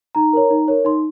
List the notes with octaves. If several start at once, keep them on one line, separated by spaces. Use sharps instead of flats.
D#4 A#5
A#4 C#5
D#4
A#4 C#5
D#4 C6